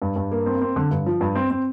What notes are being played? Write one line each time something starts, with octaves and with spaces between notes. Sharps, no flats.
G2
G2
A#3
C4
C4
D3
G2
F3
G2
C4
C4